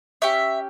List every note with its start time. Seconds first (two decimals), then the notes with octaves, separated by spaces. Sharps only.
0.22 C#4 G4 E5